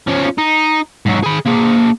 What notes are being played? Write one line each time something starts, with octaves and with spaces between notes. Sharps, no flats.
F3 C#4
D#4
G#2 F#3
G#4 B5
A#3 G#4